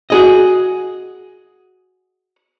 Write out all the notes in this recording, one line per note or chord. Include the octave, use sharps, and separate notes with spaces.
F#4 G#4 D#5